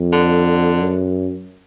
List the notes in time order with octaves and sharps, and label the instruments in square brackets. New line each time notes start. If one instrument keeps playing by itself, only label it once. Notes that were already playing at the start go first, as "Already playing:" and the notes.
Already playing: [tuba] F2
[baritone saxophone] D3
[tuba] F#2